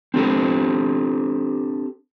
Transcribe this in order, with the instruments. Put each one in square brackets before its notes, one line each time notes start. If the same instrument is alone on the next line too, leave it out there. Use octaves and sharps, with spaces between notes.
[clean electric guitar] C4 D4 G4 A4 C5